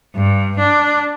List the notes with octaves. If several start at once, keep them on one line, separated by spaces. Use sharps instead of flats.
G2
D4